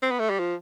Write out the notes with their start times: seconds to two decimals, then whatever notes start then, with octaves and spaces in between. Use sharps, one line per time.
0.03 C4
0.11 B3
0.20 A3
0.30 G3
0.39 F3